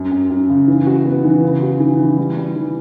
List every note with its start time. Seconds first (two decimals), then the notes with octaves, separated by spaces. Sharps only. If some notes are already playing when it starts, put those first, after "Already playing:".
Already playing: F#2
0.12 F#2
0.30 F#2
0.50 C#3
0.68 E3
0.87 F#4
1.06 B3
1.24 E3
1.44 C#3
1.62 F#4
1.80 E3
1.99 E3
2.18 G3
2.37 G3
2.56 E3